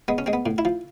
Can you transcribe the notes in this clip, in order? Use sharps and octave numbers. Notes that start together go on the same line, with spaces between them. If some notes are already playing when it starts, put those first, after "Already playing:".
G#3 B3
C#4
G#3 C4
B3
A2
E4
F3